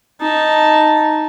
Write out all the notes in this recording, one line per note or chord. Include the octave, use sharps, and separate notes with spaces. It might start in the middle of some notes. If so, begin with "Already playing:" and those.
D#4 A5